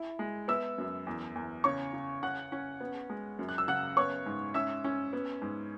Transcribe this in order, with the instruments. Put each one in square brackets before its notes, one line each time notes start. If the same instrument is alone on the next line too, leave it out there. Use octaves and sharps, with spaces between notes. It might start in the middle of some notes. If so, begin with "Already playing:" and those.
Already playing: [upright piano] E4
G#3
B3 E5 E6
F#2
E2
E2
C#3 C#5 C#6
C#3
C#4 F#5 F#6
C#4
B3
G#3
F#2
F#6
E6
C#3 F#5 F#6
B3 C#5 C#6
G#2
C#4 E5 E6
C#4
B3
G#2